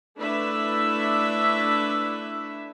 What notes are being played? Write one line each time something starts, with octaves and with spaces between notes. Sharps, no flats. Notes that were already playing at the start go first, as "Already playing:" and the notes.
A3 D4 E4 B4 E5